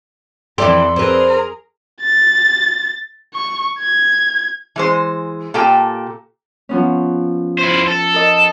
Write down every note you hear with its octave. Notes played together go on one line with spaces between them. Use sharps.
F2 E3 E4 G4 A4 D5 E5 C6
C4 G#4 A#4 B4
A6
C#6
G#6
E3 G#3 C5
A#2 G4 A4 G5
F3 B3 C#4
E4 C5
A4
A#4 D#5